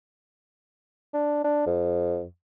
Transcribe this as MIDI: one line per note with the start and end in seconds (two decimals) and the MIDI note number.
1.13 1.43 62
1.44 1.63 62
1.66 2.24 41